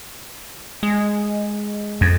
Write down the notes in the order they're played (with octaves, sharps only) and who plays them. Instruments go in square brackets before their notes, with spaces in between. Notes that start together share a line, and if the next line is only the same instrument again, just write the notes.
[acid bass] G#3
[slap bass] F2